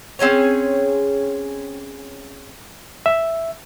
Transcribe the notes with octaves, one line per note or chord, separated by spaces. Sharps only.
C4 C#4 G#4 C#5
E5